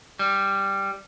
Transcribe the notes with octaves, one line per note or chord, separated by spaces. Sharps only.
G3